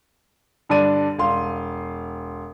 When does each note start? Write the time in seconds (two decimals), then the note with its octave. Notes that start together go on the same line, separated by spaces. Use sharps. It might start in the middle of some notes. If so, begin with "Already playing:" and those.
0.69 G2 D3 D4 D5 D#7
1.19 E1 F5 C6